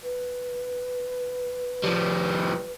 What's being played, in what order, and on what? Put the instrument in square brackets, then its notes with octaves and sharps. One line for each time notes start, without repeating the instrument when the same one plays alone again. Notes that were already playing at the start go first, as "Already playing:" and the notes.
[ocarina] B4
[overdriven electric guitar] F3 G3